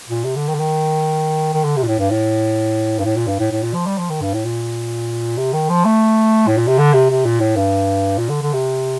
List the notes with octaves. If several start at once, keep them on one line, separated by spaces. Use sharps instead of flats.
A#2
C3
D3
D#3
D3
D#3
D#3
D3
C3
A#2
A2
G2
A2
G2
A2
A#2
G2
A2
A2
A#2
F3
G3
F3
D#3
G2
A2
A#2
C3
D#3
F3
A3
A2
A#2
C3
D3
C3
C3
A#2
A2
G2
A#2
D3
D3
C3